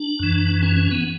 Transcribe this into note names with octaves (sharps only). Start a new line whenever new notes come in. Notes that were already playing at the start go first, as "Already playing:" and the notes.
Already playing: D4
F#2 E3
C#4
C#4
B3